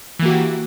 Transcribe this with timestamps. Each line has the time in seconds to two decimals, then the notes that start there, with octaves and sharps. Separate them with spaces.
0.19 E3
0.22 A#3
0.25 F#4
0.28 G4